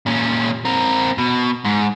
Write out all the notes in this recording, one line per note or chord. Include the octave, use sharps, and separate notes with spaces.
A#2 C#4
C4 A#4
B2
G#2